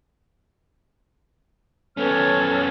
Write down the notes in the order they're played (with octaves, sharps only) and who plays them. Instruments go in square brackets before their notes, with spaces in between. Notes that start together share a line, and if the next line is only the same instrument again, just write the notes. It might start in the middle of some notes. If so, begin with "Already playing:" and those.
[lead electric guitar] B3 C#4 [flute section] A4 C#5 F6